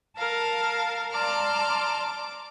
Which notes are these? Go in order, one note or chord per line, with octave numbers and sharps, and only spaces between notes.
A#4 F5 A5
D5 A5 A#5 C6 D6 F6
D6